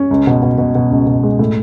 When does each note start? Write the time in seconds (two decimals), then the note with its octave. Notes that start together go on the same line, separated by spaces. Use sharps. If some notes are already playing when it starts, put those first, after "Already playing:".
Already playing: C#4
0.11 C#2
0.27 B2
0.42 B2
0.58 B2
0.75 B2
0.91 C#2
1.07 B2
1.23 G#3
1.39 A2